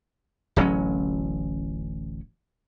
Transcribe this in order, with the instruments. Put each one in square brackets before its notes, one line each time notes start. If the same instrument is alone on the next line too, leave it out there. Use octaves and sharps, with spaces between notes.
[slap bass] D1 A1 F#3 C#4